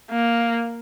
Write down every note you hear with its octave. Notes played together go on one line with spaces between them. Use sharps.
A#3